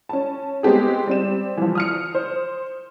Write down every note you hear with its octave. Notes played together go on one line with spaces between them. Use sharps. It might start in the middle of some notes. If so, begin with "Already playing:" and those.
C#4 A5
G#3 B3 C4 G4 G#4
G3 C4 E7
E3 F3
D#6 F6 C#7
C5